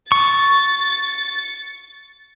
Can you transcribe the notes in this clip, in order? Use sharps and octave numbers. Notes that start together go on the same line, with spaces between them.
C#6 A6